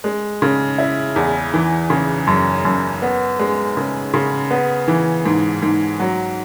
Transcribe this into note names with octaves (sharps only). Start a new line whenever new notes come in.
G#3
C#3
E4
E2
E3
C#3
F#2
F#2
B3
G#3
C#3
C#3
B3
E3
G#2
G#2
F#3